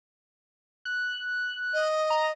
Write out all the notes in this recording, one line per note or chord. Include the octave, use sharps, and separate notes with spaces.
F#6
D#5
A#5